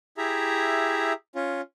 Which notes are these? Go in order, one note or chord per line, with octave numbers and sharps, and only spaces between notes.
E4 G4 G#4 E5 A#5
C#4 F4